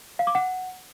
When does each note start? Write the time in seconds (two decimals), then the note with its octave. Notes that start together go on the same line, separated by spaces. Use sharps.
0.19 F5
0.27 D6
0.35 F#5